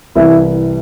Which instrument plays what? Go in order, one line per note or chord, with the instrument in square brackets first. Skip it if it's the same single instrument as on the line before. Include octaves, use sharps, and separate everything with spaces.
[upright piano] C2 C3 E3 [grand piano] E4